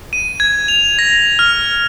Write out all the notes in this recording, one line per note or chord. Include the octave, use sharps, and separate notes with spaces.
D#7
G#6
F7
A#6
F6